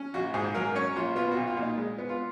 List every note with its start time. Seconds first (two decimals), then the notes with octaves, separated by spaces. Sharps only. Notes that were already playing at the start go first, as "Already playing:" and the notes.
Already playing: C#4
0.14 A#1 F#4
0.34 G#2 G#4
0.54 F#3 A#4
0.75 C#4 C#5
0.96 A#1 F4
1.16 B3 F4
1.31 F#4
1.37 B1
1.47 F4
1.57 A#2
1.62 D#4
1.78 G#3
1.98 B3
2.09 F4